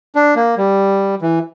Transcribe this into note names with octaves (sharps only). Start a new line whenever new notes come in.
D4
A#3
G3
E3